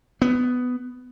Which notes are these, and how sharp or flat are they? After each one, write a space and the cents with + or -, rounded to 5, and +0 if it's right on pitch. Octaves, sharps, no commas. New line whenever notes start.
B3 +10